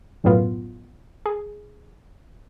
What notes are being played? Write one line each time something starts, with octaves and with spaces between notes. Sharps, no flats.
B1 F#2 A2 F#3 B3 F4
G#4